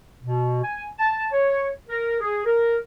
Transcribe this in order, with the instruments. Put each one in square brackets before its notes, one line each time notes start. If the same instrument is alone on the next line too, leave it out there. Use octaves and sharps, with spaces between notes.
[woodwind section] B2
G#5
A5
C#5
A#4
G#4
A#4